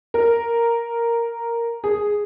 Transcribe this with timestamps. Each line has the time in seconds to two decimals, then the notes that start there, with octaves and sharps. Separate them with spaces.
0.14 A#4
1.84 G#4